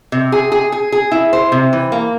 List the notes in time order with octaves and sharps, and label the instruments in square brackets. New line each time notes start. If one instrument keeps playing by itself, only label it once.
[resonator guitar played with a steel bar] C3
G#4
G#4
G#4
G#4
E4
C5
C3
E3
A#3